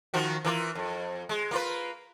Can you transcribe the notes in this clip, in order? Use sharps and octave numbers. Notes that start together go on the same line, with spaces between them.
D#3 F3 F#4
E3 A#3 F4
F2
G#3
A#3 F4 B4